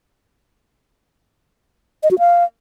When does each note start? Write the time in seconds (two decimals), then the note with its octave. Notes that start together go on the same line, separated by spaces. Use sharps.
2.03 D#5
2.11 F#4
2.19 F5